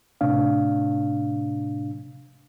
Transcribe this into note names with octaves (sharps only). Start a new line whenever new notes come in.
A2 C3 D4 F5